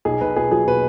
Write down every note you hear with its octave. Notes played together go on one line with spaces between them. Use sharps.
B1 G#4
B1 B4
B3 G#4
F#3 G#4
B2 B4